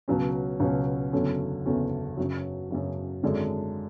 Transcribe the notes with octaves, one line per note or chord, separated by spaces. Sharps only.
C#2 B2 F#3 C#4
C#2 B2 F#3 C#4
F#1 E2 D3 F#3 C#4
F#1 E2 D3 F#3 C#4
F#2 C#3 F#3
F#2 C#3 F#3
G#1 F#2 D3 G#3 D4